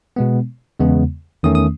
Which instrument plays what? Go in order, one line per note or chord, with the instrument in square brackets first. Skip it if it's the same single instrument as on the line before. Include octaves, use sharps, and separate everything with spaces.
[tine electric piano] B2 G#3 B3
E2 C#3 G#3 B3
E2 D#3 A3 C#4 D#6
D#6